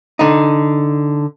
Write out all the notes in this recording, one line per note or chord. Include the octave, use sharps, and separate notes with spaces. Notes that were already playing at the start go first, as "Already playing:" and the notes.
D3 D#4